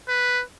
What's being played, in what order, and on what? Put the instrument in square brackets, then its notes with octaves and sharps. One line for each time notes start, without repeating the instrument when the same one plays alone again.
[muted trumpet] B4